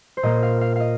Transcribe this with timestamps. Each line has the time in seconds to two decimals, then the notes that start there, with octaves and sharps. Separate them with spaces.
0.17 C5
0.23 A#2 A#3 D#5
0.43 F5
0.61 F5
0.76 D#5 F5